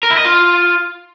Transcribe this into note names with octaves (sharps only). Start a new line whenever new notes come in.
A#4
E4
D#5
F4